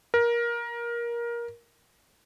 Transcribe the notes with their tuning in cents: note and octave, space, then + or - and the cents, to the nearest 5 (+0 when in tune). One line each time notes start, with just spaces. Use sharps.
A#4 +20